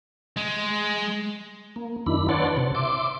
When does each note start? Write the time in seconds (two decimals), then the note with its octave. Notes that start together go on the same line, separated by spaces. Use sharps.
0.37 G#3
1.76 A#3
2.06 F#2 D#3 D4 E4 B5
2.29 B4 C#5 D5 F#5 A5 C6
2.57 C3
2.75 E5 C6 D6